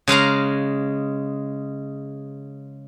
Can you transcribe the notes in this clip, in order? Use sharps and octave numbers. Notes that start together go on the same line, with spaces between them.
C#3 G#3 F5 A#5